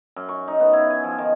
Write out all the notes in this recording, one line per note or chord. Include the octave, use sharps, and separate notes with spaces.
F#2
C#6
D#4
B3
E4
G#5
F3
D#3